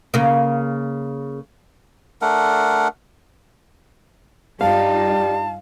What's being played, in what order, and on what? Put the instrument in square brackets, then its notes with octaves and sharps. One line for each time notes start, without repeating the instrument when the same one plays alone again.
[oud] C#3 A#3
[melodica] A3 D4 A#4 F#5
[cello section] G2 D#4 F4 [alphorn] G3 [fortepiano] F5 [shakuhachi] A5